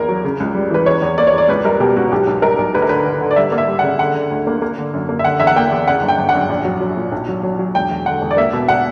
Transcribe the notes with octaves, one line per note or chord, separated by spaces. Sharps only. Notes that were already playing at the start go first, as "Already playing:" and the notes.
Already playing: E2 A#3 A#4
F#3
C#3
C#2
G3
E3 B4
E2 C#5
E2
A#3 D5
C#5
E2 D5
C#2 B4
G3 A#4
B2 G4
C#2 F#4
B1 G4
B1
G3 A#4
B1
D2 B4
A#4
D3 B4
D3
D3
D5
G3 E5
A#3
E5
G3
F#5
C#3
D3 F#5
D3
D2
A#3
A#3
D3
F#2
A#3
E5
D3 F#5
E2 E5
F#5
A#3 G5
E2
C#3 F#5
G1
G5
G1
F#5
F#2
A#1
F#3
F#3
A#2
B1
F#3
F#3
F#3
E1 G5
E1
D3 F#5
E1
D5
A#3 E5
B2
B2 F#5